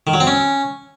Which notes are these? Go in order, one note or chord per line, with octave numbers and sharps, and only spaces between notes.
D#3
F#3
C4
C#4